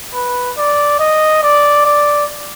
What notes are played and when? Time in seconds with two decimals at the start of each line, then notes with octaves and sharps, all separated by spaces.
0.14 B4
0.58 D5
1.00 D#5
1.43 D5
1.86 D5